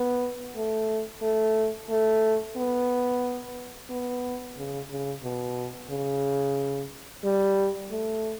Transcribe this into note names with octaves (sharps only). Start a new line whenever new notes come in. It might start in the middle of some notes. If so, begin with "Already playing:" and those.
Already playing: B3
A3
A3
A3
B3
B3
C#3
C#3
B2
C#3
G3
A3